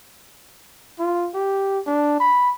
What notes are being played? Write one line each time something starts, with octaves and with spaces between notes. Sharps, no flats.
F4
G4
D4
B5